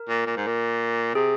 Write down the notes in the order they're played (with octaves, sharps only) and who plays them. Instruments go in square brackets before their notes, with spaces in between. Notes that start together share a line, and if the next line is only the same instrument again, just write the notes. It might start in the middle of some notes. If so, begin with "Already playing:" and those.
Already playing: [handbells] A#4
[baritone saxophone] A#2
A#2
G#2
A#2
[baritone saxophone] C3 [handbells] G#4